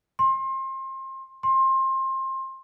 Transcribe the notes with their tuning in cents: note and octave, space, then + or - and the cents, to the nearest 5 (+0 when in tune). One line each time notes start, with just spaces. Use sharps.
C6 +30
C6 +25